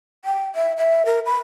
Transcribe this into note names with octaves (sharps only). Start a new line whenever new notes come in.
G5
E5
E5
A#4
B5